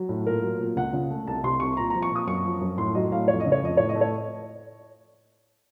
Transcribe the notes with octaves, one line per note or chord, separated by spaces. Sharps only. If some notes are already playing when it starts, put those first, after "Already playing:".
Already playing: F#3
A2
A#2 A#4
F#3
A#2
C#2 F#5
C#3
A3
C2 A5
C3 C6
C2 C#6
A#2 A#5
A#5
F3
C#6
A#2 D#6
F#2 C#6
F3
F#2
A2 C6
F#3 D#5
A2 F5
F2 C#5
D#5
C#3
C#5
F2 D#5
A2 C#5
D#5
A3
C#5